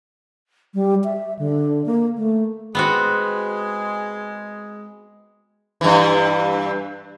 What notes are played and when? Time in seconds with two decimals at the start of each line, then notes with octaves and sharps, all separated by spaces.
0.74 G3
1.04 E5
1.39 D3
1.86 A#3
2.17 A3
2.75 G#3 B3 C4 F#4
5.81 G2 E3